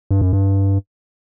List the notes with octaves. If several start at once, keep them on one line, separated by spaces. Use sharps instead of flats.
G2
F#2
G2